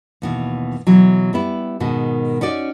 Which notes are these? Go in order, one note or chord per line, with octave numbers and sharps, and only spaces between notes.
D#2 B2 E3
B2 E3 F#3
G3 B3 E4
G#2 B2 D#3
C#4 D#4 F#4 D5